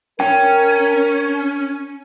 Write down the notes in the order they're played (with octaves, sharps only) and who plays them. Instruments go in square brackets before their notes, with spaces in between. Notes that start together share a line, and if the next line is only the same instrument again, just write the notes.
[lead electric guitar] C#4 [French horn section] A#4 [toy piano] G5